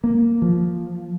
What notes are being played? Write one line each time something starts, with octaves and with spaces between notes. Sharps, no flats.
A#3
F3